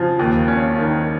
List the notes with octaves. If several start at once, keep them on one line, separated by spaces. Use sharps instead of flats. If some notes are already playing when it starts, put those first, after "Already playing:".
Already playing: C#3 F3
D#2
C#4
D#3